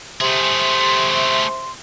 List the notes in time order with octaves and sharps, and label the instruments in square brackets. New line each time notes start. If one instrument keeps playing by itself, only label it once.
[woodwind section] C3 C6 [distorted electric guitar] A3 G#4